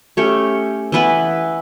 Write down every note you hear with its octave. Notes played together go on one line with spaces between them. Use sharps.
A3 C#4 G4 C#5
E3 B3 E4 B4